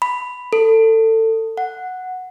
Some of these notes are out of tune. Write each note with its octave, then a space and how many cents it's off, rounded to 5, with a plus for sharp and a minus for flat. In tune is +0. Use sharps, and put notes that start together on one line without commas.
B5 +5
A4 +25
F#5 -5